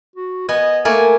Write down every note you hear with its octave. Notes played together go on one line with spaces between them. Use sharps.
F#4
B3 D#5 G#5
A3 A#3 G#5